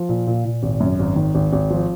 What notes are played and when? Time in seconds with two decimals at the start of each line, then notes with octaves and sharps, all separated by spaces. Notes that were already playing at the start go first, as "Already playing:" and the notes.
Already playing: F3
0.09 A#2
0.27 A#2
0.45 A#2
0.63 G#1
0.80 F#2
0.99 G#1
1.16 D#3
1.35 G#1
1.53 G#1
1.71 F3